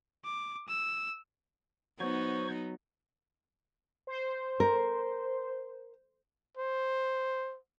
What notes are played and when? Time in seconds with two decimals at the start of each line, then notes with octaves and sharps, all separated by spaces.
0.24 D6
0.68 E6
2.00 F#3 B3 D#4 C5 C#5 C#6
4.07 C5
4.60 A#4
6.57 C5